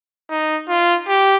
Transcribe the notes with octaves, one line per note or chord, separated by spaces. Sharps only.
D#4
F4
G4